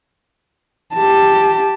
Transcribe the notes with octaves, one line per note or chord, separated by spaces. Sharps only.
G4 A5